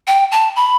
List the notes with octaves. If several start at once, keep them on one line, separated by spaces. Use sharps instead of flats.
G5
A5
B5